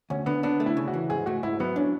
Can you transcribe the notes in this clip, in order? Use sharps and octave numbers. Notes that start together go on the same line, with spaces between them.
D2 C#4
D3 B3
B3 D4
A3
E4
C#3
F#4
E3
G#2 G#4
A3 F#4
G#2 E4
F#3 B3
C#4 D4